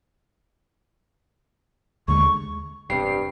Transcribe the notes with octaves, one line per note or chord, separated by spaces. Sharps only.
D#2 D3 G#3 C#6
E1 G2 C3 G3 C7